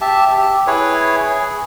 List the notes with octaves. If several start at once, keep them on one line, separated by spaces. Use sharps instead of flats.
G4 E5 A5
G4
E4 G#4 B4 C#5
G#4